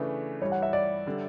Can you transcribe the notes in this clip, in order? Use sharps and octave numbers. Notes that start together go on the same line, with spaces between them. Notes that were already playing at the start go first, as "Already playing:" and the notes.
Already playing: C#3 E3 A3 D4 B4
G2 E3 G3 C#5
F#5
E5
D5
D3 G3